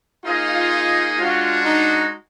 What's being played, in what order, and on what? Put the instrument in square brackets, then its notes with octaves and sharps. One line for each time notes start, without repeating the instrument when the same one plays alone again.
[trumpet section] A#3 D#4 G#4 D#5 [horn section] F4
[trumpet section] G#3 D4 F#4 [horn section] F4
[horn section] D#4